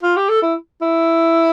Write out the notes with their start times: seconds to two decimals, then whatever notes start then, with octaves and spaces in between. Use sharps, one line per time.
0.03 F4
0.16 G4
0.29 A4
0.42 E4
0.82 E4